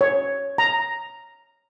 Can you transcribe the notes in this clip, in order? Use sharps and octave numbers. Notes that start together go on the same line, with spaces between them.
C#5
A#5